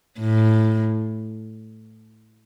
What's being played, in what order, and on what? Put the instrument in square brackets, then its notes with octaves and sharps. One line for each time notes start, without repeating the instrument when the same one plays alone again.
[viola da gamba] A2